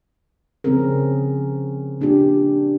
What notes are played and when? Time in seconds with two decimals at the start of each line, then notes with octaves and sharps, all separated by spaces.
0.64 C#3 F3 C4 C#4 G#4 A#4
2.01 A#3 D4 F4 G4